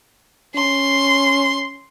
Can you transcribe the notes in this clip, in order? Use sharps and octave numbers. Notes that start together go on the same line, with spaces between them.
C#4 C6